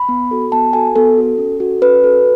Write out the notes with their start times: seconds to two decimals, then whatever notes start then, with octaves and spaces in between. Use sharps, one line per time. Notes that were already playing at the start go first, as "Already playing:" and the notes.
Already playing: B5
0.09 B3
0.31 F#4 A4
0.52 B3 A5
0.73 F#4 A4 G#5
0.96 B3 A4
1.17 F#4 A4
1.38 C#4
1.60 F#4 A4
1.82 C#4 B4
2.04 F#4 A4